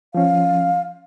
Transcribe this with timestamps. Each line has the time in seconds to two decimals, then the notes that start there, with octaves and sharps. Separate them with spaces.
0.15 F3 C#4 F5